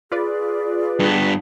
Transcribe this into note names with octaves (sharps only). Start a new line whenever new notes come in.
F4 G#4 B4 D5
G2 B3